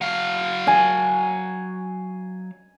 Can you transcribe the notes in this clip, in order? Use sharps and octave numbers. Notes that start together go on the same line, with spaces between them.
F#3 F5
G#5